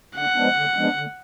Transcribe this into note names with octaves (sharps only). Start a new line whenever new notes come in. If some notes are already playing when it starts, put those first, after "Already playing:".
D3 F#5
F3 G#3 B3 D4
D3
F3 G#3 B3 D4
D3